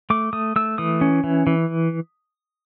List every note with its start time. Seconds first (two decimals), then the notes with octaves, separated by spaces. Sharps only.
0.10 A3 D6
0.33 A3 D#6
0.56 A3 E6
0.78 E3 D#6
1.01 C#4
1.24 E3
1.47 E3